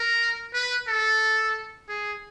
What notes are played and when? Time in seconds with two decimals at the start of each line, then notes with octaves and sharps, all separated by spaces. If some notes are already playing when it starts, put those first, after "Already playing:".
Already playing: A#4
0.53 B4
0.87 A4
1.88 G#4